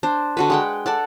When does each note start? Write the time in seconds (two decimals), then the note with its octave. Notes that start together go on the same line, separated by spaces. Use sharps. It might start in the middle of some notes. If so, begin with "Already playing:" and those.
0.03 D4 C5
0.37 D3 F#4 B4
0.50 G#3 F#5 G5
0.86 A4 D5 F#5